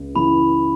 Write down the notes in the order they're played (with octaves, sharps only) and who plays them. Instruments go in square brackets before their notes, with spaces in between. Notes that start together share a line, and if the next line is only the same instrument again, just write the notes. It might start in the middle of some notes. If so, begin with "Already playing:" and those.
Already playing: [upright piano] C#2 C#3
[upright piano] C#3 E3 [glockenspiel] B5